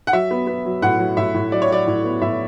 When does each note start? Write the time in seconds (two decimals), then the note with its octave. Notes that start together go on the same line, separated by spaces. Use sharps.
0.07 F#5
0.13 F#3 E5
0.31 B3
0.47 B3
0.65 F#3
0.82 A2 F#5
0.99 F#3
1.17 A2 E5
1.34 A2
1.52 F#3 D5
1.62 C#5
1.69 F#3 D5
1.87 A2
2.04 B3
2.22 A2 E5